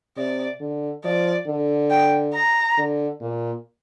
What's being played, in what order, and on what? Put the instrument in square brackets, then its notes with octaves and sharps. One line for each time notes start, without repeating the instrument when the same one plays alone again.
[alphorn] C3 [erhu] D5
[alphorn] D3
[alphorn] F3 [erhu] D5
[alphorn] D3
[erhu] G5
A#5
[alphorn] D3
A#2